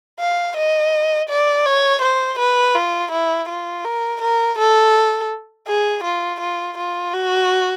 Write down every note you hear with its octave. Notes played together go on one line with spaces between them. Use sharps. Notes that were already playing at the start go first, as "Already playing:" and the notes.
F5
D#5
D5
C#5
C5
B4
F4
E4
F4
A#4
A#4
A4
G#4
F4
F4
F4
F#4